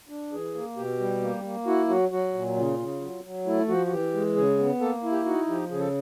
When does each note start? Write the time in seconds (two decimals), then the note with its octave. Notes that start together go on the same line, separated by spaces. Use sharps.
0.09 D4
0.32 E3 G#4
0.55 A#3
0.76 B2 G4
1.00 G3
1.22 A#3
1.44 A#3
1.66 E4 F#4
1.89 F#3 F#4
2.11 F#3 F#4
2.34 A#2
2.57 C#3 F4
2.79 C#3
3.01 F#3
3.24 F#3
3.46 A3 E4
3.68 F3 F#4
3.86 F#4
3.91 E3 G4
4.14 G#3
4.36 C#3 G#4
4.58 B3
4.80 A#3 A4
5.03 E4
5.11 G4
5.25 D#4 F#4
5.49 F3 G4
5.71 C#3 G#4
5.80 A4